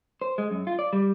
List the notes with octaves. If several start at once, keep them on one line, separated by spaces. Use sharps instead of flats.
C5
G#3
F#2
F4
D5
G3